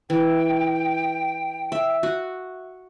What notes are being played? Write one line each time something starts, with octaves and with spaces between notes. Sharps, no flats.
E3 G5
E5
F#4